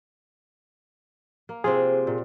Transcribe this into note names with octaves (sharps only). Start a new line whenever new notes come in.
A#3
C3 C4 F4 G#4
A#2